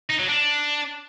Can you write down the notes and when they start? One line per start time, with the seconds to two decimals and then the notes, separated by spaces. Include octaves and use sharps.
0.10 D#4
0.19 F#3
0.28 D4